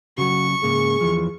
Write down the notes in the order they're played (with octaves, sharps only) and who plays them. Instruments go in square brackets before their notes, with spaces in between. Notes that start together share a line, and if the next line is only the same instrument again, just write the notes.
[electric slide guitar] C#3 F#3 [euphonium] F#4 [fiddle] C#6
[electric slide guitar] G#2 C#3 A#3 [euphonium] G#4
[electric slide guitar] E2 E3 F3